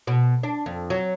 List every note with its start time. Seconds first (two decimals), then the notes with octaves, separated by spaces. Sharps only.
0.07 B2
0.43 D4
0.66 F2
0.90 F#3